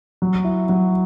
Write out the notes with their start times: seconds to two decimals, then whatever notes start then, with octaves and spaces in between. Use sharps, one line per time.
0.22 F#3
0.44 E4
0.69 F#3